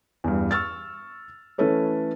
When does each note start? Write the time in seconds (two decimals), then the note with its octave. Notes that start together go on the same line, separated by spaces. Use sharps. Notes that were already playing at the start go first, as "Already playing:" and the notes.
0.24 E2 G2
0.51 C#6 E6 F6 A6
1.58 E3 A3 C#4 A4 B4 C#5